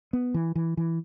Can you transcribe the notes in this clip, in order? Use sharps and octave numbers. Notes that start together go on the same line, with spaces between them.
B3
E3
E3
E3